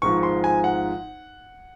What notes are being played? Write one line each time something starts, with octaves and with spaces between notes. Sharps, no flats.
G#1 G#2 F3 C#6
C6
G#5
F#5